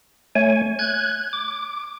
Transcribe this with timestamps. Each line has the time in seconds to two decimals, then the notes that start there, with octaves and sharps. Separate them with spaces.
0.35 A3 C#5 G#5
0.79 F#6 G#6
1.33 D6